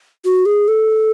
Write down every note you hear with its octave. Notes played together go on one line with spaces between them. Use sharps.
F#4
G#4
A4